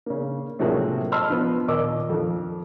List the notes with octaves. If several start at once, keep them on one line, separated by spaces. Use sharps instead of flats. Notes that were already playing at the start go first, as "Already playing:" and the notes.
C#3 A#3
A2 C3 F3 F#3 G#3 A#3
D#5 A5 B5 C6 E6 F6
F3 B3
D#2 A#2 A#3 D#5 D6 E6
F2 F3